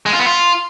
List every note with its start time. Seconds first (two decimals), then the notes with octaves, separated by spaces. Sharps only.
0.06 G#3
0.13 F4
0.19 B3
0.26 F4